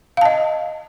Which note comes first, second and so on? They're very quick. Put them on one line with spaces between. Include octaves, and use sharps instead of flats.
F5 A5 D#5